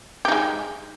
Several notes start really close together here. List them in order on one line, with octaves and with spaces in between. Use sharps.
G4 D#4 G#3